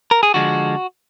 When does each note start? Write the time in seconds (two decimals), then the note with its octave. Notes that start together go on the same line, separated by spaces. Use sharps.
0.11 A#4
0.23 G#4
0.34 D3 F3 G#3 F#4